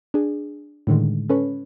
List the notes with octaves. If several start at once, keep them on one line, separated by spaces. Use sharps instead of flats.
D4 G#4
A2 D3 D#3 G#3
C#4 A4 B4 C#5